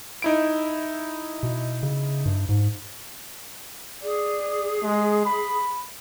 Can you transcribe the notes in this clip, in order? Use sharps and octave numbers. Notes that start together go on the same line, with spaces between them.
D#4 E4 D7
B2
C#3
G2
G#2
G#4 D5
G#3
B5